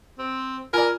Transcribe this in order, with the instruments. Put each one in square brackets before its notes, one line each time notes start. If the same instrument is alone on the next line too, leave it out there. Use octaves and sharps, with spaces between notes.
[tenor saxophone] C4
[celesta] F4 [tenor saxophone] A#4 [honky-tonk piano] D5 G#5